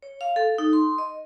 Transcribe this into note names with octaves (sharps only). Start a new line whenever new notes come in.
C#5
F5
A4
D#4
C6
D#5